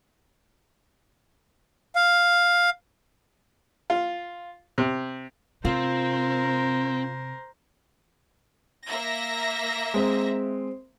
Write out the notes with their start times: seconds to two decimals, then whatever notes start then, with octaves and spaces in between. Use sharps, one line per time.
1.96 F5
3.90 F4
4.78 C3
5.65 C3 C4 F4 A#4 C5
8.86 A#3 E5 A#6
9.94 G#3 C4